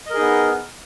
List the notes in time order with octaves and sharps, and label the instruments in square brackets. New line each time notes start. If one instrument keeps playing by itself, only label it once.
[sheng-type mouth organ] D#5
A#4
G#4
D#4
B3